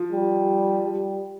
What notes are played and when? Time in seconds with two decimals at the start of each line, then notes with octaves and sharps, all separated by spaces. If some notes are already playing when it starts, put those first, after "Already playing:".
Already playing: F3
0.12 G3
0.85 G3